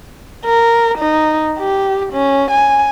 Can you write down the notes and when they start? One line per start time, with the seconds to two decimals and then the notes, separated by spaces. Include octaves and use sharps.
0.45 A#4
0.99 D#4
1.59 G4
2.13 C#4
2.51 G#5